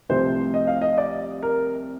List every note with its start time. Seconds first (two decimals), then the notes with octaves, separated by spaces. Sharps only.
0.09 C2 C3 F3 A3 C5
0.54 D#5
0.67 F5
0.82 D#5
0.98 D5
1.42 A#4